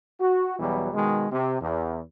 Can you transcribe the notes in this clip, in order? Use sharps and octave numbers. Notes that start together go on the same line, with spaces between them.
F#4
E2 B2 E3 F#3 G3
B2 D#3 G#3
C3
E2